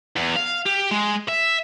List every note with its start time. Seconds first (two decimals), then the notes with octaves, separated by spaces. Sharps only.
0.16 E2
0.36 F5
0.66 G4
0.91 G#3
1.28 E5